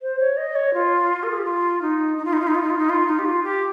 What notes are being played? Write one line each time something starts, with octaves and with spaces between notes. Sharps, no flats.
C5
C#5
D#5
C#5
F4
A#4
G#4
G4
F4
D#4
D#4
F4
D#4
F4
D#4
F4
D#4
F4
D#4
F4
D#4
G4
F4
G4